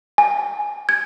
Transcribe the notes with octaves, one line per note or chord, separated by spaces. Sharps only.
G#5
G#6